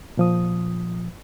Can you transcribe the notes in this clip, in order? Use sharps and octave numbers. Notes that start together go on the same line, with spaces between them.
A#2 F3 D#6